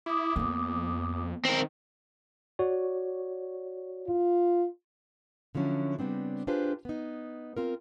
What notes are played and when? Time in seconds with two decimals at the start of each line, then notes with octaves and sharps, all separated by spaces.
0.06 E4 D6 D#6
0.36 F2 A#3 B3
1.45 D#3 C4 A#4
2.59 F#4 C#5 D5
4.08 F4
5.55 D3 F3 F#3 C#4 E4
5.99 C#3 G3 B3 C4 D4
6.47 D4 F4 G4 G#4 B4 C5
6.85 B3 D#4
7.57 C4 F4 A#4